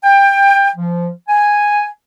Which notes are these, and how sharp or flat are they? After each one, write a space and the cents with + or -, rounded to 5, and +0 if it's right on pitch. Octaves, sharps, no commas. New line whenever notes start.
G5 +20
F3 -15
G#5 -5